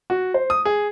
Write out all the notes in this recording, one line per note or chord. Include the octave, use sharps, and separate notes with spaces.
F#4
C5
D#6
G#4